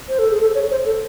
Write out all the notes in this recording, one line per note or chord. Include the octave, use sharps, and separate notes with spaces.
C5
A4
G#4
A4
C#5
C5
A4